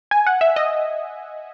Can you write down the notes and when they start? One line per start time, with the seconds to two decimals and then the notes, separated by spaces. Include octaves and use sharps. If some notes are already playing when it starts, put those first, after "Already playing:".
0.11 G#5
0.27 F#5
0.41 E5
0.56 D#5